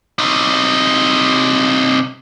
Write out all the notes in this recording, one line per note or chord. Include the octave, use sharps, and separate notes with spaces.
C3 D#4